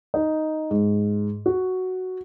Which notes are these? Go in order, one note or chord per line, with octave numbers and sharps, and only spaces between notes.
D#4
G#2
F#4